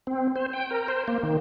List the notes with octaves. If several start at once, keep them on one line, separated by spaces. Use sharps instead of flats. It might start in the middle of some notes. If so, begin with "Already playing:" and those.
C4
C5
G5
A#4
C5
A#3
D#3